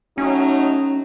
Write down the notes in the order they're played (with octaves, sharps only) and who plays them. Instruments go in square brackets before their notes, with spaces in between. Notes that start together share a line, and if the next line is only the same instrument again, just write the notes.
[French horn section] A2 F#3 D#4 [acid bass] C#4